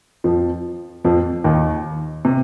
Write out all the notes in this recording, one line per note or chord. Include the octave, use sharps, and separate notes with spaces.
F2 F3
F2 F3
D#2 D#3
C3